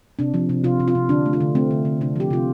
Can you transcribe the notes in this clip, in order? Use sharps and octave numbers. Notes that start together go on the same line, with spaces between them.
C3 D4
F3
C3
C3 F4
C3
F4
C3
D3 D4
A3
F4
D3
A3 C4
D3
D3
C3 D4
F3 G4
C3 F4